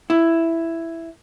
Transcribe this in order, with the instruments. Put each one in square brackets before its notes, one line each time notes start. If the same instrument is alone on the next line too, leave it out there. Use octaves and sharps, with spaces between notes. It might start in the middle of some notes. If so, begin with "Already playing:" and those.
[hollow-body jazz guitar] E4